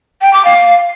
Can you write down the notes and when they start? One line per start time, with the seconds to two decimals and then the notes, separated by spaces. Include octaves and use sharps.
0.22 G5
0.33 D6
0.45 F5